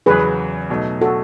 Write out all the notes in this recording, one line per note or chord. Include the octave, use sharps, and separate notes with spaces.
E2 C#3 F#3 G#4 B4
B2 F#3 A3 D#4
F#4 A4